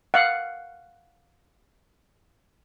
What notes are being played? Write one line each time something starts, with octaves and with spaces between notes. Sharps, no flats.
F5 F#5